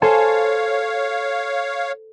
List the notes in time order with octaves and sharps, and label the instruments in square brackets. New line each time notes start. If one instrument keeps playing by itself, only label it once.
[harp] A4 C5 G#5 [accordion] C#5 F5